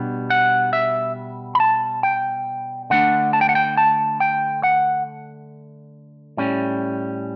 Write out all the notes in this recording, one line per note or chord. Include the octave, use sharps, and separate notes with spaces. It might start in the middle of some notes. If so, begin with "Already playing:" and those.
Already playing: B2 G3 B3 D4
F#5
E5
B5
A5
G5
D3 A3 D4 F#5
A5
G5
F#5
G5
A5
G5
F#5
A2 G3 C#4